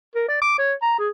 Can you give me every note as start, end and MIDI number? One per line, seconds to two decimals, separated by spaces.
0.15 0.25 70
0.29 0.41 74
0.42 0.57 86
0.58 0.73 73
0.82 0.97 82
0.99 1.09 68